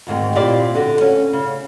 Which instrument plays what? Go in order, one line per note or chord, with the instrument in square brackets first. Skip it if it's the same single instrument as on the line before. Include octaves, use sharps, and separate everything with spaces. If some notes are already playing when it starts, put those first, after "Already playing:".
[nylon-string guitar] D2 G#2 D#3 C4
A#2 C4 E4 G4 D5
D3 F#4
C#4
C#3